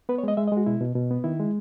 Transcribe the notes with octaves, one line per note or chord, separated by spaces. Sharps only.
B3 B4
C#5
G#3 D#5
G#3 E5
D#5
G#3 F#4
B2 E4
B2
B2
B3
D#3 E4
G#3